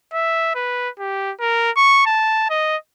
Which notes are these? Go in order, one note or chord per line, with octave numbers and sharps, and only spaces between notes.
E5
B4
G4
A#4
C#6
A5
D#5